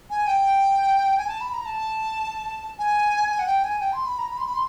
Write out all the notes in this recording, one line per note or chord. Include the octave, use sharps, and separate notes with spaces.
G#5
G5
G#5
A5
B5
A#5
A5
G#5
G#5
F#5
G5
G#5
G5
C6
B5
A#5
B5
C6
B5
C6